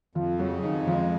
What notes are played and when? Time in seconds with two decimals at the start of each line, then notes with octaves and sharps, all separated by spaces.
0.15 F2 F3 F4
0.39 C#3 F#3 F#4
0.63 F2 D#3 D#4
0.87 F3 G#3 F4